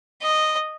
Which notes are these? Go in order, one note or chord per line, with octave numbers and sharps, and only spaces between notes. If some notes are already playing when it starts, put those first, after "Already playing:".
D#5